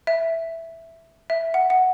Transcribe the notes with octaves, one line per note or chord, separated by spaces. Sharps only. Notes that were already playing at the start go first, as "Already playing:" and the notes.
E5
E5
F#5
F#5